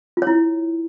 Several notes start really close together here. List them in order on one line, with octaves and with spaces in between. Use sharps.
F4 C#5 E4